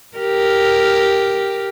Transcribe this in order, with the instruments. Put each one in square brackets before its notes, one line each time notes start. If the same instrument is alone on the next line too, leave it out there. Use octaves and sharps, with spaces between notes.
[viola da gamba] G4 A#4